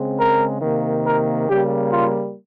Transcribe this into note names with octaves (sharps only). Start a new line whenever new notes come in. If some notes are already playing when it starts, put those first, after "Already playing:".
Already playing: C#3 G#3 C4
A#4
C3 D#3 A#3
A#4
C#3 G3 A#3 G4
F4